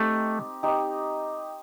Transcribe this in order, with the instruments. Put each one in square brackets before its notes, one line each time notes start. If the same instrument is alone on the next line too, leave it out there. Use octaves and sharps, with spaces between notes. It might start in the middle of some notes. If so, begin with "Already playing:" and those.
Already playing: [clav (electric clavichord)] A3 [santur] C4 D#4 G4
[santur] C4 D#4 G4